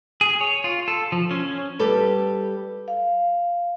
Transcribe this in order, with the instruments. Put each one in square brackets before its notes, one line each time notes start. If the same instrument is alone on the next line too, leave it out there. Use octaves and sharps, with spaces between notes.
[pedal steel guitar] G#4
C#5
F4
A4
F3
C#4
[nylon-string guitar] G3 G4 A4 B4
[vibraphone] F5